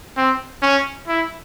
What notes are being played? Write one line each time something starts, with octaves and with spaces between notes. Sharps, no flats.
C4
C#4
E4